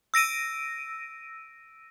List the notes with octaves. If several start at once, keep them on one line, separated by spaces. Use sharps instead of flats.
E6 A#6 D7 D#7